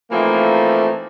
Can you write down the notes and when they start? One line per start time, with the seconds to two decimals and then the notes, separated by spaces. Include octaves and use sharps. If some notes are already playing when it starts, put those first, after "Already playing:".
0.12 E3 F3 A3 A#3 C4 D#4